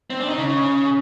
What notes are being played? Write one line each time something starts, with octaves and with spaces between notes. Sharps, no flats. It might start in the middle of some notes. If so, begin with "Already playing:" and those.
C4
D4
D#4
C#3